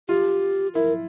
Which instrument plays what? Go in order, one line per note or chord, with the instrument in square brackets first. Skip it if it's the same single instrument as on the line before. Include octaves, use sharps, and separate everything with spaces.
[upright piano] F4 [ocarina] G4
[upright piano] E4 [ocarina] A#4